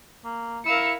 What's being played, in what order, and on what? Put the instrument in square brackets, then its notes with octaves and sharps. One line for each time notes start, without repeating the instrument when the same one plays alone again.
[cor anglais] A#3
[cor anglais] E4 [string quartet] A#4 F5 E6 [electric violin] C#7